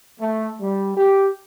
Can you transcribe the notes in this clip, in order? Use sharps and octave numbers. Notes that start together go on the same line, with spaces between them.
A3
G3
G4